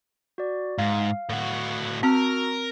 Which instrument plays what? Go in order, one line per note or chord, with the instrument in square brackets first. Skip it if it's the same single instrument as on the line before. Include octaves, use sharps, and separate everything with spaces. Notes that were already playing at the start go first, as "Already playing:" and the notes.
[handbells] F#4 D5
[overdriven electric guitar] G#2 [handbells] F5
[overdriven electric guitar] A2 F#4
[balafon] C4 [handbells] F#4 E6 F6 [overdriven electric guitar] A#4